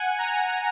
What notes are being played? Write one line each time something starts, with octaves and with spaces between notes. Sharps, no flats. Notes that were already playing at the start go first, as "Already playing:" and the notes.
Already playing: F#5 G#5
G#5 A#5